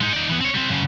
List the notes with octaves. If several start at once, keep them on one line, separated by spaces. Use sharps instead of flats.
G#3 D#4
D#4 D5
E3 B3
C4 C#5
G3 C4
F#2 C#3